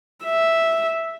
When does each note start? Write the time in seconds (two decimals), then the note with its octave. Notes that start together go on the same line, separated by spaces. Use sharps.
0.24 E5